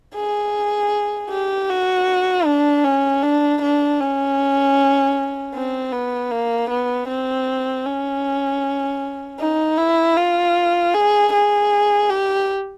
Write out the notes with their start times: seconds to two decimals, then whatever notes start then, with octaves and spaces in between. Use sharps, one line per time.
0.15 G#4
1.30 G4
1.69 F#4
2.45 D4
2.84 C#4
3.22 D4
3.62 D4
4.01 C#4
5.55 C4
5.92 B3
6.31 A#3
6.70 B3
7.09 C4
7.86 C#4
9.39 D#4
9.78 E4
10.17 F4
10.94 G#4
11.33 G#4
12.10 G4